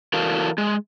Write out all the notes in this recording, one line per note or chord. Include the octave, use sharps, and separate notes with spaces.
E3 E4 F#4 A4 A#4 F5
G#3